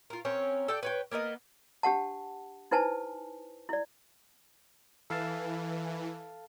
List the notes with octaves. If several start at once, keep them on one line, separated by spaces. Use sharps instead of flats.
F4 A#4
C4 C#4 A#4 C#5
A4 D5 G5
B4 C#5 G5
A#3 B3 A#4 D#5
D4 G4 F#5 A5
D#4 E4 B4 C5 G#5 A5
E4 D5
E3 A4 F5 A5